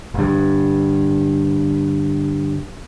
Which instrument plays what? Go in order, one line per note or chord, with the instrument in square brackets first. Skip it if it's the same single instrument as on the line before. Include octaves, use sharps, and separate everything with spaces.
[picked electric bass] G1 G2